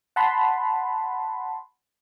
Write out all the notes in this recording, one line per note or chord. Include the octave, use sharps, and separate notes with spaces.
F#5 A5 B5 C6